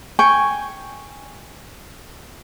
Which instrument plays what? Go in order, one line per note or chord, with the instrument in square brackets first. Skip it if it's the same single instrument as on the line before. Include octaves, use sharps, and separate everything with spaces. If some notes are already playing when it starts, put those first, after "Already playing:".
[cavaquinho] G5 G#5 C#6